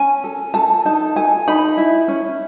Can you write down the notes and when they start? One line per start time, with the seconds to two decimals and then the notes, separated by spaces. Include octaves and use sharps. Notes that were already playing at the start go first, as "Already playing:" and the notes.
Already playing: C#4 G#5
0.24 A4
0.54 A4 A5
0.85 D#4 A5
1.16 A4 G#5
1.47 D#4 B5
1.77 E4
2.08 C#4